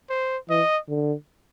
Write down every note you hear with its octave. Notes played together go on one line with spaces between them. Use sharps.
C5
E3 D#5
D3